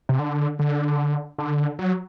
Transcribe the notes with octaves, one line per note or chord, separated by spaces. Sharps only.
C3
D3
D3
D3
F#3